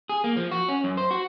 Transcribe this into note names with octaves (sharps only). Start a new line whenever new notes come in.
G#4
A#3
F3
F#4
C#4
F#2
C5
F#4